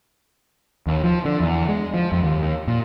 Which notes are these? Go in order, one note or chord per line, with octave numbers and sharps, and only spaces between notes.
D#2
F3
D3
E2
G#3
F3
F2
D#2
A#2